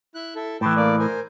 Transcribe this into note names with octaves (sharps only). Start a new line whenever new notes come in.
E4 F#6
E4 A4
A2 E3 G5 A5
A#3 D5
A#4 C5 G#5